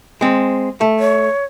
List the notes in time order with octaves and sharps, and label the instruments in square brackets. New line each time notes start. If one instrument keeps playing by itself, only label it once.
[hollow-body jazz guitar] G#3 C4
A3
[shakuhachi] C#5